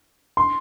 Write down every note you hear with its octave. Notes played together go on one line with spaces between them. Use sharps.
C6